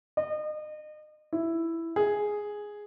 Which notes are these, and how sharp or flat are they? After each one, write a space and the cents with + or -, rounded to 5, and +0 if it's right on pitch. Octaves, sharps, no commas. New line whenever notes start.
D#5 -35
E4 +5
G#4 +0